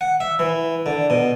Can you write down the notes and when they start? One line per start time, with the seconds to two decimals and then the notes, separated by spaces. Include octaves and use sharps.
0.01 F#5
0.20 E5
0.39 E3
0.86 D3
1.10 B2